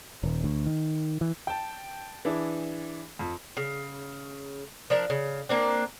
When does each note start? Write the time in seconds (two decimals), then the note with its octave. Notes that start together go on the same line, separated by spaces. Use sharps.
0.23 D#1
0.44 D2
0.66 D#3
1.21 E3
1.47 G5 A5
2.25 E3 D4 E4 G#4
3.19 F2
3.57 C#3
4.90 F3 D4 A#4
5.10 C#3
5.49 A#3 C4 D4